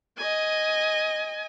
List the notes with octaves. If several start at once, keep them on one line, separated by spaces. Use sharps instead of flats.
D#5 G#5